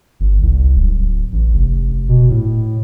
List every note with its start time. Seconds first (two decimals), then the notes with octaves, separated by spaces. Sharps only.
0.20 G1
0.41 C2
0.75 D1
1.32 A1
1.54 F1
2.09 B2
2.30 A2